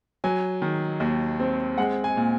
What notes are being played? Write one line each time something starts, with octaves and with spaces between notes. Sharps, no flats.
F#3 G#5
D#3
D#2
C4
G#3 F#5
G#5
A#2